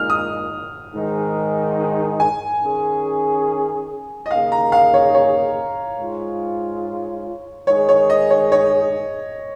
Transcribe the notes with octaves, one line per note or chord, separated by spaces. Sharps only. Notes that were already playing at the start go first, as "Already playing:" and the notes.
Already playing: A#2 G#3 D#4 F6
D#6
G#2 D#3 G#3 D#4 G#4
G#5
D#3 C#4 G#4
D#5
D#2 C#3 A#3 D#4 G#4 F5
A#5
F5
C#5
C#5
G#2 G#3 F4
D#3 G#3 D#4 G#4 C#5
C#5
D#5
C#5
C#5